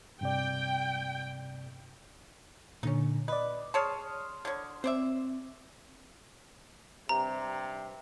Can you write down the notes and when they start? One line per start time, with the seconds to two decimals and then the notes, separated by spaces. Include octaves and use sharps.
0.21 G2 C3 D5 G5
2.83 A#2 D3 C#4 D#4
3.28 B4 D5 D#5
3.74 G#4 C#5 A5 C6 D#6 F6
4.45 D3 C#5
4.84 C4 C5 D5 E5
7.09 G2 C3 A#5